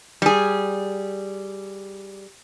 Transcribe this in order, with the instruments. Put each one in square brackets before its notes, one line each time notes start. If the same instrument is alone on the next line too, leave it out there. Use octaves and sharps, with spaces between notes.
[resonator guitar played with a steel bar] G3 G#4